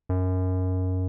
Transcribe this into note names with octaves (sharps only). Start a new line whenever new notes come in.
F#2